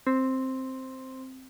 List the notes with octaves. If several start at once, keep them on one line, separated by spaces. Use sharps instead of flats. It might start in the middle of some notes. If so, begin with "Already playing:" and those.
C4